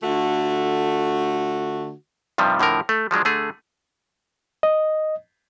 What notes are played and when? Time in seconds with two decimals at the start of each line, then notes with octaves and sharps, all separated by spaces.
0.03 D3 A3 F4 F#4
2.38 G2 C3 D#3 F3 G3
2.59 A2 D3 F3 A#4
2.89 A3
3.11 F3 F#3 G#3 D4
3.25 D3 A3 G#4
4.63 D#5